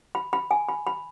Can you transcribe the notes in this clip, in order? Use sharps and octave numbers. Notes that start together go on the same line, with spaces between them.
B5
B5
G#5
B5
B5